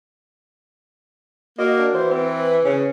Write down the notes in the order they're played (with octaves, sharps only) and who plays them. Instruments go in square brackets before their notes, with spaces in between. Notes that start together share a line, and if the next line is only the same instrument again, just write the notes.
[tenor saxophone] A#3 [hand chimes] F#4 [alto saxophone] D#5
[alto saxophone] D4
[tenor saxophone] E3 [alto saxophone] C5
[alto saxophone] C4 [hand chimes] B4
[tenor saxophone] C#3 [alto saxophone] C#4